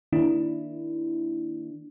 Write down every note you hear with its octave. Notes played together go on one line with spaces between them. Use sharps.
D#3 A#3 D4 E4